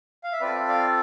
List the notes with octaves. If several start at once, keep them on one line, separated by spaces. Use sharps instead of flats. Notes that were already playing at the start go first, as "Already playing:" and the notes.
F5
E5
C4 F4 A4 B4 D5
D5 F5